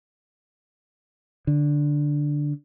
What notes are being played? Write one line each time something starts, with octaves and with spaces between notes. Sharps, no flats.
D3